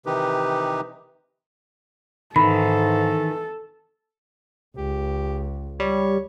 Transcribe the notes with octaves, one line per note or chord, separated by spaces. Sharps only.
C3 D#3 E3 D#4 G4 B4
G#2 D#3 E3 A4 B5
C#2 G4
G3 C#5